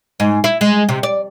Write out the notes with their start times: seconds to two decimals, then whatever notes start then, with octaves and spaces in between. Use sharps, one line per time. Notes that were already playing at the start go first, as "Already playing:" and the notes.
0.20 G#2
0.44 E4
0.61 G#3
0.89 C3
1.03 D5